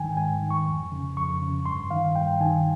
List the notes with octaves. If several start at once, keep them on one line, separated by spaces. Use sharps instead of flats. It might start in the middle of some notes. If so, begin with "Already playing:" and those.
Already playing: G#2 D#3 G5 G#5
G#2 G#5
D#3
C#6
F2
C#3
F2 C#6
C#3
G2 C6
D#3 F5
G2 G5
D#3 G#5